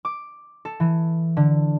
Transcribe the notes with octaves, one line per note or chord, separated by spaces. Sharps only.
D6
A4
E3
D3